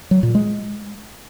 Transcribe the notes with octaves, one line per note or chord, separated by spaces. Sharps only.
F#3
A#2
G#3